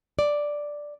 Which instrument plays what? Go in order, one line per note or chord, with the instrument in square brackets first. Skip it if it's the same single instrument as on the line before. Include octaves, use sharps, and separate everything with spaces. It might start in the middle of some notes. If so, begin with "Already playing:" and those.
[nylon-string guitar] D5